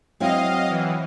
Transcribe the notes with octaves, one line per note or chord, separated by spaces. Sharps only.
F#3 C4 E4 D#5 F5
E3